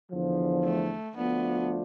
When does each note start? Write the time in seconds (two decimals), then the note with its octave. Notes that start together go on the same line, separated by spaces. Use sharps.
0.12 E2 D3 F3
0.65 A3
1.17 D2 D3 F3 A3 B3 D4